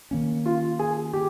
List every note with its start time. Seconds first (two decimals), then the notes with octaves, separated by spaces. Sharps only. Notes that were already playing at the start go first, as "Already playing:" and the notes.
0.11 D#3 A#3 C#4
0.46 F4
0.79 G#4
1.13 G4